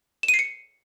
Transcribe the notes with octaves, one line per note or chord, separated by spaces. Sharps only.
E7
D#7
C7
C#7